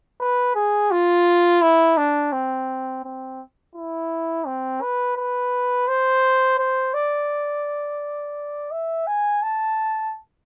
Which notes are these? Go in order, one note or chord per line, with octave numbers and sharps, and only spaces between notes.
B4
G#4
F4
E4
D4
C4
C4
E4
C4
B4
B4
C5
C5
D5
E5
G#5
A5